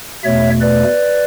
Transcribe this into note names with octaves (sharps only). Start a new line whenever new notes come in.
E2 B2 A3 C#5 E5
B4 D5